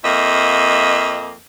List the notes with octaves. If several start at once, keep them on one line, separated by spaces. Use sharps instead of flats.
F2 A#3 D#5 E5